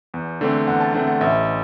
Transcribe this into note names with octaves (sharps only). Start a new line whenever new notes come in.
E2
D3 A3 C4
E2 F#5
A5
D3 A3 C4 F#5
F#5
A1 E5